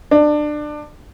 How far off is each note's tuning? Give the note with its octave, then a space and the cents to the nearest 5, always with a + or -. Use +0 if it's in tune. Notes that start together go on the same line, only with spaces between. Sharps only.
D4 +25